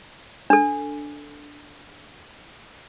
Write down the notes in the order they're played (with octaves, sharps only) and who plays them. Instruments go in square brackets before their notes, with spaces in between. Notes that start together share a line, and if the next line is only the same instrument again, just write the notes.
[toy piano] D4 A4